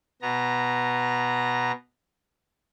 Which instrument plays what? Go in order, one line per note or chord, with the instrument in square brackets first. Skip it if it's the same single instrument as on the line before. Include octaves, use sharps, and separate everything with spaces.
[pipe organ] B2 B3 A#5